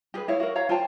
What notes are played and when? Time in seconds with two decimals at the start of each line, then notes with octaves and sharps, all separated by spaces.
0.14 G4 G#4 B4
0.28 E4 C#5 F5
0.40 F#4 A#4
0.56 C#5 F5 A#5
0.69 F4 C5 G5 A5